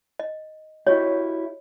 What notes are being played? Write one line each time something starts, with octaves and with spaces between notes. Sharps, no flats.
D#5
E4 F#4 G4 C#5 D#5